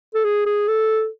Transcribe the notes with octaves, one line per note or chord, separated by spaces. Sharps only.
A4
G#4
G#4
A4